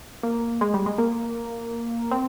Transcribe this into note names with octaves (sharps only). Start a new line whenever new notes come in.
A#3
G#3
G3
G#3
A#3
C4